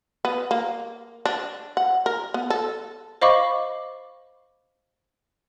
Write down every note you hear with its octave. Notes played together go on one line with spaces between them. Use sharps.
B3
A#3
D4
F#5
A#4
B3
A4
C5 D#5 F5 B5 C#6 D6